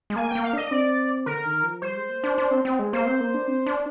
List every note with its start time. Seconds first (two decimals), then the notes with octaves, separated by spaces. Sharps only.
0.10 G#3
0.16 A#3 G#5
0.30 G5
0.35 A#3
0.44 F5
0.53 D4 D#5
0.71 C4 D5
1.26 D3 A#4
1.45 D#3
1.63 F3
1.82 G3 C5
1.96 G#3
2.09 A#3
2.24 D4
2.38 D4
2.51 C4
2.65 C4
2.79 G#3
2.93 A#3 C5
3.06 C4
3.21 A#3
3.34 D4
3.48 C4
3.66 D4